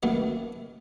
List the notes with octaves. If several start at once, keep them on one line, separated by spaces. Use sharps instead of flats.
F#2 D3 D#3 A3 B3